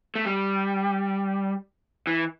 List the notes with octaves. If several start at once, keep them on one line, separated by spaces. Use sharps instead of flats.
A3
G3
E3